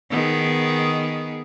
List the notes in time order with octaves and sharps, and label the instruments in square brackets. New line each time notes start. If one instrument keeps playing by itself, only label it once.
[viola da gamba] D#3 B3 G#4